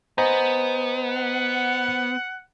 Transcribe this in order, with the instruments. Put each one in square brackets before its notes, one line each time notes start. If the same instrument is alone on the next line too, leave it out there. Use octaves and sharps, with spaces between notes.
[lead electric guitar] B3 [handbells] C5 [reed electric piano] D#5 G#5 A#5
[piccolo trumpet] F#5